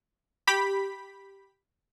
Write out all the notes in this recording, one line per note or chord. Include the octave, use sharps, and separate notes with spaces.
G4 B5 B6